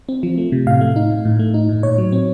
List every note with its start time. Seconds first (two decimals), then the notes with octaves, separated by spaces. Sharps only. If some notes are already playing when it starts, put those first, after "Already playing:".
0.09 C4
0.23 F3
0.38 A3
0.52 C3
0.67 A2 F5
0.81 A3
0.96 D#4
1.11 A2
1.25 A2
1.39 A3
1.54 D#4
1.69 A2
1.83 A#2 C#5
1.98 F#3
2.12 C4